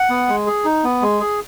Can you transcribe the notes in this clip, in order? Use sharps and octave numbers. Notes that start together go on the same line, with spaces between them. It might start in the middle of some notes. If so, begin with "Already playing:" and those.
Already playing: F#5
B3
G#3
G#4
D#4
B3
G#3
G#4